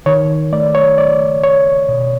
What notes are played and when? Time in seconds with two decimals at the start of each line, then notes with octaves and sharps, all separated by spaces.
0.06 D#3 C#5
0.52 A3 D5
0.75 C#5
0.98 A3 D5
1.43 D#3 C#5
1.89 B2